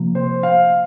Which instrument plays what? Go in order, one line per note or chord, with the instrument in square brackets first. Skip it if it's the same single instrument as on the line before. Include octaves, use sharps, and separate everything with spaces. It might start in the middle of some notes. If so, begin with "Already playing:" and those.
Already playing: [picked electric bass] C3 F3 A#3
[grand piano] C5
F5